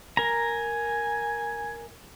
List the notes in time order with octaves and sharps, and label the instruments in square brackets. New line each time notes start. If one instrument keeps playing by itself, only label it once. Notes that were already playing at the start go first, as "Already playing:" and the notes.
[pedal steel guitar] A#4 A#5 [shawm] G#5